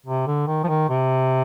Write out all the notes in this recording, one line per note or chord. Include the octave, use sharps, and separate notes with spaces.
C3
D3
D#3
F3
D#3
C3